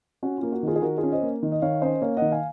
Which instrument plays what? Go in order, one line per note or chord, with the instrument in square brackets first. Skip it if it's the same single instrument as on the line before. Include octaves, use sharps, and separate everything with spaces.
[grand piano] C#4 F#4
A#3 F4
F#4
D#3 F4 G#4
G#4
D#3 F#4 A#4
F4 G#4
C#4
C5 D#5
A#3
D#3
D#5
D#3 C#5 F5
C#4 C5 D#5
A#3 C#5 F5
D#3 D#5 F#5
F5 G#5